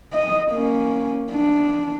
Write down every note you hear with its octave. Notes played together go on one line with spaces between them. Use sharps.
D#5
A#3 C#4
D4